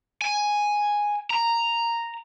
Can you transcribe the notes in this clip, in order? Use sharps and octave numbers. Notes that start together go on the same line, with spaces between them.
G#5
A#5